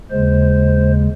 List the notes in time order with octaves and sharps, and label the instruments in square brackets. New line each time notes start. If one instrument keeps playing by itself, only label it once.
[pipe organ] D#2 C#3 G#3 C5